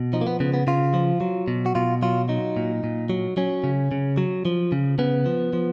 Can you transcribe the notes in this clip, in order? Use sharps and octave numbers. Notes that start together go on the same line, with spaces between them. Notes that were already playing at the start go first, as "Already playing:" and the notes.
Already playing: B2
F3 D#4
A#3
B3
C#3 B3
B3
C#3 F4
F3
F#3
B2
F#4
B2 F4
F#3 F4
F#3 D#4
A#2
A#2
F#3
F#3 C#4
C#3
C#3
F#3
F3
C#3
C#3 B3
F3
F3